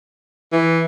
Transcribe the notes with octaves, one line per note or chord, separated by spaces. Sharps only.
E3